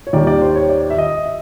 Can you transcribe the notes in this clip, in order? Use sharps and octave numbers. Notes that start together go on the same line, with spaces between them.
C#5
D#2 D#3 G3 D5
D5
C5
C#5
D5
E5
D#5
E5